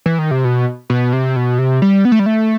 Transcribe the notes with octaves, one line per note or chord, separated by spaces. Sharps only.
E3
D#3
C3
B2
B2
C3
B2
C3
G3
B3
A3
G3
A3